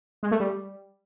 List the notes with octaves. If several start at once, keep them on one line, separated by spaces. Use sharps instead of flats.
G#3
A3
G3